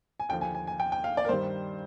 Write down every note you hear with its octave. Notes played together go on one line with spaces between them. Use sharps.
G#5
D#2 D3 F3 G5
G#5
G#5
G#5
G5
G5
F5
D5
A#4
G2 D#3 G3 C5